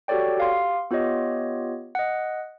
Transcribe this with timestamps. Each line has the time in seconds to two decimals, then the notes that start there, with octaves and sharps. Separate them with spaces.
0.08 F#4 G4 A4 C#5 D5 G5
0.38 G4 F5 C6
0.91 B3 F4 G4 C#5 D#5
1.95 D#5 F#5